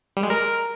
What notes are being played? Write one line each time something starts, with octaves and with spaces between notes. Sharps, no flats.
G3
G#3
A#4